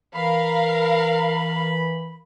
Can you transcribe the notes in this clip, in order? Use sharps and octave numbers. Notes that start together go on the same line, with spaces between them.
E3 A#4 F5 B5